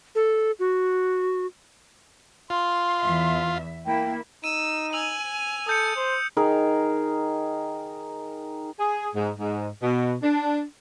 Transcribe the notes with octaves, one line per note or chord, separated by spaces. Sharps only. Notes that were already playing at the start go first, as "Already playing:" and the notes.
A4
F#4
F4 C6
E2 E5
A#3 E4 G5
D#4 E6 D#7
G#5 E6 F7 F#7
A4 D#6 G6 C#7
C5
D#3 D#4 G#4 A#4
G#4
G#2
G#2
B2
D4